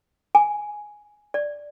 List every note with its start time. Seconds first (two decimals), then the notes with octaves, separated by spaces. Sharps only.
0.35 G#5
1.34 D5